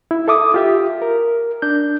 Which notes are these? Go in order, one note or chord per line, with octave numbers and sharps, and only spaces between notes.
E4
A4 E5 D6 D#6
F4 G4 E5
A#4
D4 G6